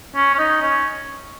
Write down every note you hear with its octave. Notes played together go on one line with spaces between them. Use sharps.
C#4
C#4
D#4
C#4